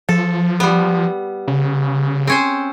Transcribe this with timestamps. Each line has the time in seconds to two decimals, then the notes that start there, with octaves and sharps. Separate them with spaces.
0.09 F3 A4
0.60 G3 B3
1.48 C#3
2.27 C4 C#4 C5